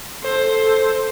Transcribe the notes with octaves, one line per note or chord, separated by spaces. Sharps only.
A4 C5